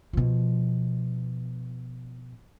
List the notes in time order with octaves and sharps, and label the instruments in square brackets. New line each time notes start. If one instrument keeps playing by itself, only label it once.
[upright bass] B2 F3